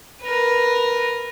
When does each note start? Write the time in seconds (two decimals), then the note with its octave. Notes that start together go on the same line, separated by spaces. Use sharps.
0.23 A#4 B4